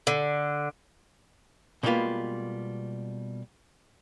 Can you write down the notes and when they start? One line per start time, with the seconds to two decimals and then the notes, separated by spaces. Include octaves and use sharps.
0.07 D3
1.83 B2 G3 G#3 A#3 F4 B4